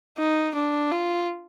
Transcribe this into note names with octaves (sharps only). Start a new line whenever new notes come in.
D#4
D4
F4